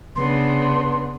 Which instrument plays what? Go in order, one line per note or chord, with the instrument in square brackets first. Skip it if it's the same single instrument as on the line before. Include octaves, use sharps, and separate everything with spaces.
[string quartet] C#3 B3 D4 [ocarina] C6